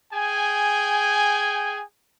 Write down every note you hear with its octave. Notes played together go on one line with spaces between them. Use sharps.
G#4 G5 G#5